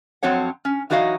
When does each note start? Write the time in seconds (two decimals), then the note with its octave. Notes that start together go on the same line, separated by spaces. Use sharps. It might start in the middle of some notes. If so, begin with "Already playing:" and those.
0.23 F2 F#3 C4 C#5 F#5
0.65 C#4
0.90 E3 F#3 D#4 F#4 D#5 F5